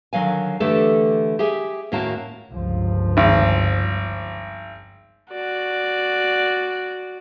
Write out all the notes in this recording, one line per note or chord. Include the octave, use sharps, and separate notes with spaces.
D3 D#3 F#3 F5 G#5
D3 E3 A3 G4 A4
G4 G#4 E5 G#5
D#2 A2 A#3 C#4 F#4 A5
G1 C#2 F3
G#1
F#4 D5